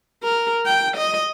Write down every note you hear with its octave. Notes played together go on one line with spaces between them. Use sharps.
A#4
G5
D#5